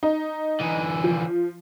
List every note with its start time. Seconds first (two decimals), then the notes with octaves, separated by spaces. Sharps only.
0.03 D#4
0.60 D3 E3
1.04 F3